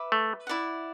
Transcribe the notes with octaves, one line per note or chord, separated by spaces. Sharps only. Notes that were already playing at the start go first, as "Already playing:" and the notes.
Already playing: B4 E5 D6
A3
E4 D5 F#5